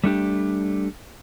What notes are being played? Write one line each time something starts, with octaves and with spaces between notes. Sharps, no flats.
G3 A3 D4 G4